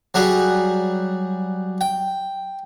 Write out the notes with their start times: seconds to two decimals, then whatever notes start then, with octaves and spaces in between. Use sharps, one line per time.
0.14 F#3 G3 G#4
1.81 G5